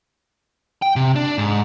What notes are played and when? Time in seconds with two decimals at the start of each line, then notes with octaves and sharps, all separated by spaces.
0.82 G5
0.96 C3
1.16 D4
1.38 G#2